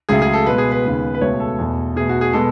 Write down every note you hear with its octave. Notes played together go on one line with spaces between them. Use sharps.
C#2 C#3 F#3 A3 G#4
G#4
A4
B2 G#3 B3 B4
G#4
B4
D#2 C#3 G#3 B3
B4
C#2 B2 A3 C#5
A4
E2 B2 A3
B2 A3 G#4
F#4
G#4
B2 G#3 B3 A4